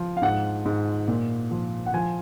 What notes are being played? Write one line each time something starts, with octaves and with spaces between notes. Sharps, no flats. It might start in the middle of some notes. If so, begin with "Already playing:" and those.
Already playing: F3
F5
G#2 F#5
G#2
A#2
F3
F#5
F3 G#5